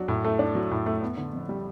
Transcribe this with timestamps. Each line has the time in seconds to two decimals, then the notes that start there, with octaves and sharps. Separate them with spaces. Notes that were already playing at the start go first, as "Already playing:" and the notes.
Already playing: F#3 D4
0.08 A2
0.25 A3
0.39 D4
0.55 F#3
0.71 A2
0.86 A3
1.02 B3
1.17 D3
1.33 F2
1.49 G3